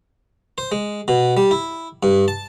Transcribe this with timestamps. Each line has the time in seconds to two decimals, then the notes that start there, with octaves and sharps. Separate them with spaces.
0.58 C5
0.72 G#3
1.08 B2
1.37 G3
1.51 E4
2.03 G2
2.28 A5